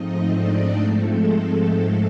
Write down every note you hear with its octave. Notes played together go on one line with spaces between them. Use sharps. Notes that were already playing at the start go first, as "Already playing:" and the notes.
Already playing: G#2 F3 A3 C4 D#4 D#5
D4 D5
G#2 F3 G#3 A3 C4 A4
A3 A4